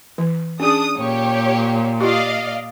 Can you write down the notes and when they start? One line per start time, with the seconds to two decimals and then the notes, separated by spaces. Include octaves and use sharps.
0.18 E3
0.60 C#4 D4 G#4 D#6
0.97 A#2 G4 C#5
2.01 F4 G4 D5 D#5 F5